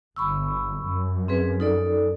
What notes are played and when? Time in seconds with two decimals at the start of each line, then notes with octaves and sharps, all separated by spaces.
0.16 G1 B5 C#6 E6
0.79 F#2
1.28 C4 G#4 B4
1.60 D#4 A4 D5